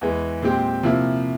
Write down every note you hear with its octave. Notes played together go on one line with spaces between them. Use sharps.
E2 E3 G#3
A#2 G#3 C4 G4
C3 F3 A#3 E4